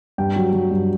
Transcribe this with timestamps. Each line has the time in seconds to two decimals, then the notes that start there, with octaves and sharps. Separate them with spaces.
0.18 G2 G5
0.36 F#3
0.53 F#3
0.71 G2